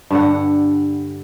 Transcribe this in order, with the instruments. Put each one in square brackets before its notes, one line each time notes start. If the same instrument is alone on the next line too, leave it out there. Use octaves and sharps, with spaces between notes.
[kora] G2 D3 F#5